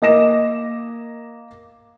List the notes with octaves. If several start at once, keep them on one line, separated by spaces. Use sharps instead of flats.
A#3 D#5 D6 A#6 E7